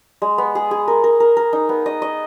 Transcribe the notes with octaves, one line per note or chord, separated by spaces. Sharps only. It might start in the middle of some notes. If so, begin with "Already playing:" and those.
G#3
B3
G#4
G#4
A#4
A#4
A#4
A#4
D#4
B3
D#5
D#5